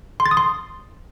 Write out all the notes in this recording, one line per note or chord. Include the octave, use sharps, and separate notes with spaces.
C6
A6
D#6
C6